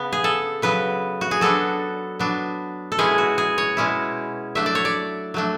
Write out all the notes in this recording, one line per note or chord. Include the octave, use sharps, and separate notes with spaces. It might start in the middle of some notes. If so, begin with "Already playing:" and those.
Already playing: C#3 B3
G#4
A4
C#3 F#3 B3 B4
F#4
G#4
F#3 B3 D4 A4
F#3 B3 D4
A4
B2 G#3 C#4 E4 G#4
F#4
G#4
C#5
B2 G#3 C#4 E4
F#3 A3 D4 E5
D5
C#5
D5
F#3 A3 D4